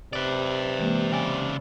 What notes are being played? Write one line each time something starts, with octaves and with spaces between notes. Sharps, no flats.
C3 B4 D5
E3 G#3 A#3
C#3 D5 G5 G#5